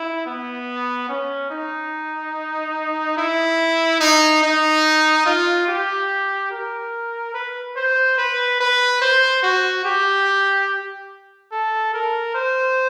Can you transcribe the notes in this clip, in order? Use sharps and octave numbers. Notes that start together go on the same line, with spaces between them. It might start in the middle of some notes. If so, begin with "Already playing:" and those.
Already playing: E4
B3
C#4
D#4
E4
D#4
D#4
F4
G4
A#4
B4
C5
B4
B4
C5
F#4
G4
A4
A#4
C5